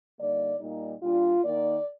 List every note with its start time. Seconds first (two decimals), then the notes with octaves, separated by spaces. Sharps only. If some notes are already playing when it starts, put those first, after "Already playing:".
0.19 D3 G3 A#3 D#4 D5
0.61 A#2 G3 A#3 D#4
1.02 A#2 G3 D4 F4
1.43 D#3 A#3 D#4 D5